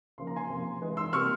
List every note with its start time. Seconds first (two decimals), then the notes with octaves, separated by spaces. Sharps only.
0.18 C#3 F3 A#3 C6
0.27 A#5
0.36 G#5 C6
0.49 C3 F3 A#3
0.81 E3 G#3
0.97 C6 E6
1.13 C3 G3 A#3 C#6 F6